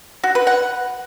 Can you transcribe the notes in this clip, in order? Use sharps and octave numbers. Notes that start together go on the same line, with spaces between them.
F#4
B4
F#5